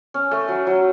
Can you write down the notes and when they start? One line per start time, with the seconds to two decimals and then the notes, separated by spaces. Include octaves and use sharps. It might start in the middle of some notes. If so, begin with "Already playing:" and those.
0.14 C#4
0.31 A3
0.48 F#3
0.67 F#3